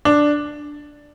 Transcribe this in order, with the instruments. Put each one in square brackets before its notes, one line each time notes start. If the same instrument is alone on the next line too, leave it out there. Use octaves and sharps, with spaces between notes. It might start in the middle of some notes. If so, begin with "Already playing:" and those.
[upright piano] D4